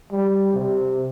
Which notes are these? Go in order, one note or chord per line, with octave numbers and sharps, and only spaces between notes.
G3
C3